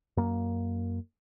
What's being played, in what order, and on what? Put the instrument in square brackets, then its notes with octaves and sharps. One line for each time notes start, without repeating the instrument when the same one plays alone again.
[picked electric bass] F#2 A#3